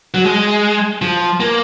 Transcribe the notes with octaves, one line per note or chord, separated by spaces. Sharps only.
F#3
G#3
F3
A#3